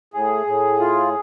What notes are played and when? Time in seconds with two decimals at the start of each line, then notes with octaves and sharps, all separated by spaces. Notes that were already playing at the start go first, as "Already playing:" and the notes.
0.13 A2 G#4
0.46 A2
0.80 F4